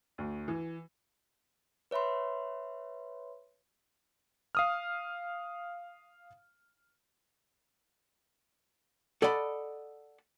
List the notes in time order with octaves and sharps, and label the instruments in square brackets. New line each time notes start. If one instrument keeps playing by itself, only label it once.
[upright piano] D2
E3
[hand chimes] B4 C#5 E5 B5 C6
[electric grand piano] F5 D#6 F6
[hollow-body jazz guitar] A4 D5 D#5 F#5 B5